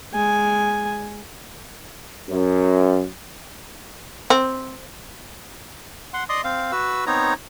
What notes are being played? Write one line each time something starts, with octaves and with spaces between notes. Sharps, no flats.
G#3 G#5
F#2
C4
F#5 C6
D5 D#5 C6 D#6
C4 F5
F#4 B4 E6
B3 C4 D#4 C#5 A#5